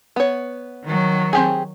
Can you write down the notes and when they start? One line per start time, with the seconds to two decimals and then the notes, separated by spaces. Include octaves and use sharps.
0.16 B3 C#5
0.84 D#3 F#3
1.33 C4 G4 G#4